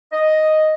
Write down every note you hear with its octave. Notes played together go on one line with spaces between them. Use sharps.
D#5